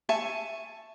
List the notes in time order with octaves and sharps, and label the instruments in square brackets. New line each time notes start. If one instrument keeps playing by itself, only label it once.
[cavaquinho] E5 G#5 A5 C#6